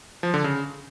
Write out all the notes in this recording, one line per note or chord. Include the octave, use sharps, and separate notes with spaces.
F3
D3
C#3